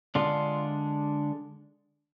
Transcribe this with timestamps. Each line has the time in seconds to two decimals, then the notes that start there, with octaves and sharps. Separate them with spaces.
0.15 D3 G#3 D4 F4